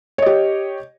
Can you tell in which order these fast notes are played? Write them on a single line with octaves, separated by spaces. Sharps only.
C#5 D#5 G4